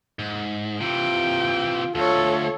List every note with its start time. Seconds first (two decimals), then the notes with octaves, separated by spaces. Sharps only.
0.19 G#2
0.81 C3 E3 F4 G5
1.95 D2 F4 A4 C#5